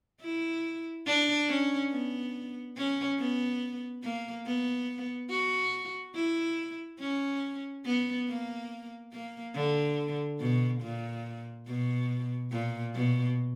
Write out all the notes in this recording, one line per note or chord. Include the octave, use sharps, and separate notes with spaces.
E4
D4
C#4
B3
C#4
B3
A#3
B3
F#4
E4
C#4
B3
A#3
A#3
D3
B2
A#2
B2
A#2
B2